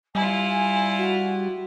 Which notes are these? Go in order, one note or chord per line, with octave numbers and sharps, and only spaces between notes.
G3 E4 F4 G#5
F#4